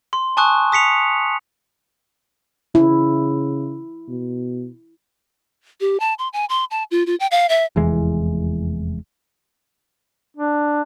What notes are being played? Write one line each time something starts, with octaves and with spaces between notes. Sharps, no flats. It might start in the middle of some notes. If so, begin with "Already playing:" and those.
C6
G#5 A5 C#6 D#6 F#6
D#6 B6 C#7 F7
C#3 E4
B2
G4
A5
C6
G#5
C6
A5
F4
F4
G5
F5
E5
F1 E2 E3 G#3
D4